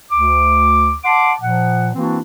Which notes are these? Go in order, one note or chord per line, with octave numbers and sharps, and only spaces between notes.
D2 D6
F#5 A5 C6 D6
A#2 F3 F#5
E3 A#3 C4 D4 E4 F#4